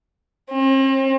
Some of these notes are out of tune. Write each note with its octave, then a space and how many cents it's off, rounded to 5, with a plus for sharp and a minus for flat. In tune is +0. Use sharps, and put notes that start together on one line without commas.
C4 +40